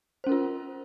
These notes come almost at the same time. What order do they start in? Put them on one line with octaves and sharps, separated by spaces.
C5 C#4 A#4 F4